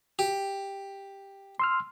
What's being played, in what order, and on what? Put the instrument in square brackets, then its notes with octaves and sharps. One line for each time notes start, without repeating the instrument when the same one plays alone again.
[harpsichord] G4
[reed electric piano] C6 E6 F6